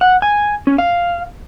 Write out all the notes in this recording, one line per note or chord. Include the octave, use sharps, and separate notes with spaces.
F#5
G#5
C#4
F5